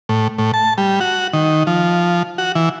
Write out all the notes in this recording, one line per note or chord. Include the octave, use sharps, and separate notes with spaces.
A2
A2
A5
G3
F#4
D#3
F3
F#4
E3